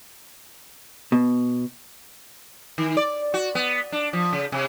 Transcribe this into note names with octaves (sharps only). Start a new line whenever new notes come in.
B2
D#3
D5
F#4
B3
D4
F3
C#3
C3